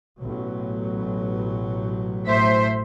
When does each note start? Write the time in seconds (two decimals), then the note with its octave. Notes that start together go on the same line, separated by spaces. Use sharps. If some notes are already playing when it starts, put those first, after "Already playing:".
0.18 A1 B2 F#3
2.28 A2 C5 E5